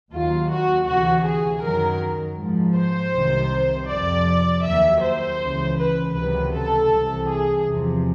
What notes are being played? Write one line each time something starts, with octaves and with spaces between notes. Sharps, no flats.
D#2 D#3 F#3 F4
F#4
D2 C3 E3 F#4
G#4
F#2 D#3 F#3 A#4
G#2 F3
C5
C2 C3 D#3
F2 C3 F3 D5
D#2 D#3 F#3 E5
C5
C#2 C#3 E3
B4
C#2 C3 D#3 F#3 B4
A4
C2 C3 E3
G#4
E2 C3 F3